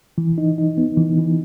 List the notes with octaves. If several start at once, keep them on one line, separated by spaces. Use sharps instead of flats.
E3
D#4
D#4
B3
E3
E3